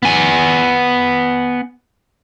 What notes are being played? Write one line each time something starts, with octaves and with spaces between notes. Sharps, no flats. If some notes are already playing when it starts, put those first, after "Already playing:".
B3 G#5